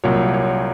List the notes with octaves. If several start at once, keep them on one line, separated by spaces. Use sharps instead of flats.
C2 A#2 F#3 A#3 C#5
C#5